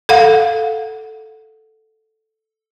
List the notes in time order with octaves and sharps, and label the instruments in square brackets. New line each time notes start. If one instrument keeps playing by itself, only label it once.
[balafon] A4 F5 F#5